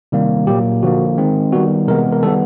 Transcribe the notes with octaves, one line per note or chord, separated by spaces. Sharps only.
C3 D#3 G3 A#3
A#2 F#3 A#3 G4
D3 F3 A#3 F#4
D#3 G#3 C4
D#3 G3 B3 F#4
C3 E3 G#3 B3 A#4
A#4
D#3 G3 B3 A4